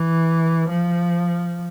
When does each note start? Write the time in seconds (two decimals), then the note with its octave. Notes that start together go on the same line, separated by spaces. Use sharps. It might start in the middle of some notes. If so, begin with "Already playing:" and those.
Already playing: E3
0.69 F3